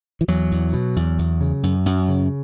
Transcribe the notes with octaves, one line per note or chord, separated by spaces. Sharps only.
E3
E2 F#3
E2
B2
E2
E2
C#3
F#2
F#2
C#3